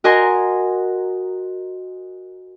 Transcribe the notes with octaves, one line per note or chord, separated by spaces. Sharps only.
F#4 A#4 D#5 G#5 A#5 C6